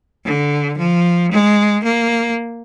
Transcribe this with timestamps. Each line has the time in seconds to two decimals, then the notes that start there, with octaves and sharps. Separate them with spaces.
0.25 D3
0.78 F3
1.31 G#3
1.84 A#3